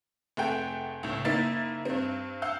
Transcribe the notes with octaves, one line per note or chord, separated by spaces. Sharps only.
F1 A3 G#4 F#5 G5
C#2 A2
F#1 A#3 D#4 E4 A6
G2 C4
F5 F#5 E6 G6